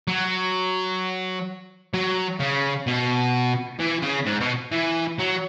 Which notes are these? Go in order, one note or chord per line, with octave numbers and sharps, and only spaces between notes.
F#3
F#3
C#3
B2
E3
C#3
G#2
B2
E3
F#3